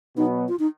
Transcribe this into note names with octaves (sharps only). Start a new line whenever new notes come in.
B2 F#3 B3 D#4
F4
D#4